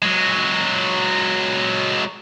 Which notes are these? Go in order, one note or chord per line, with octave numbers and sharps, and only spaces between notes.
F#3 G#3